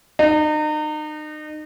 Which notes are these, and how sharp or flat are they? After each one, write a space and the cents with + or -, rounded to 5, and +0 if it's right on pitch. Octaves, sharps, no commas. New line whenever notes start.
D#4 -35